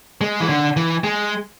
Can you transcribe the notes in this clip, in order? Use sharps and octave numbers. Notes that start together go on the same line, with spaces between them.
G#3
E3
D3
E3
G#3